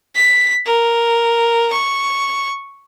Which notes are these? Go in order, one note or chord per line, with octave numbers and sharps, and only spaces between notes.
B6
A#4
C#6